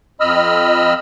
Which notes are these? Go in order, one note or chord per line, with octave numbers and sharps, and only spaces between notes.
F2 D#5 B5 E6 F6